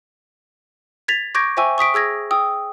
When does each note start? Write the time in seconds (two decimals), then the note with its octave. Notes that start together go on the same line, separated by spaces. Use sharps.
1.08 G#6 A6 B6 F7
1.35 C#6 D6 G6 G#6 A#6 D7
1.57 C5 E5 G5 G#5 C#6 E6
1.78 C#6 D#6 B6 D7
1.94 G#4 E6 G#6 A#6
2.31 G5 D#6 E6